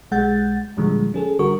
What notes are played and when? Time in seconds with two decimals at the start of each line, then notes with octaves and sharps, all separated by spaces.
0.11 B1 G#3 F#5 G6 A6
0.77 D#2 A#2 D3 F3 G3 G#3
1.14 C#4 G#4 A4
1.39 A1 D3 G3 F#4 A#4 C#6